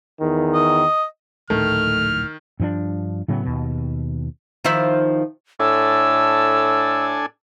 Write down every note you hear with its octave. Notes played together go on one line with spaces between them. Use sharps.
E2 D#3
D#5
D1 A#1 A2 D#3 A3 F6
G2 F3 C#4 D4
A2 C#3 F#3 B3
D#2 B2
D#3 F3 E4
A2 D4 A4 G#5 E6